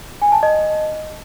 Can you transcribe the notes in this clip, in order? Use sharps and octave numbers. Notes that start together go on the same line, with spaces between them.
G#5
A5
D#5